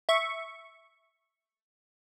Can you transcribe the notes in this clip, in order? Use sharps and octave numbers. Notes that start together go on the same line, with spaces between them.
E5 C#6